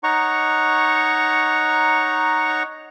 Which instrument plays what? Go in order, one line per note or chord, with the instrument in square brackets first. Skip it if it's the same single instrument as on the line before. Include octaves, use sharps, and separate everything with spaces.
[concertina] D#4 C#5 F#5 A#5 C#6